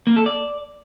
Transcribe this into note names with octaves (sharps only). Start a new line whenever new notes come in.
A#3
A4
D5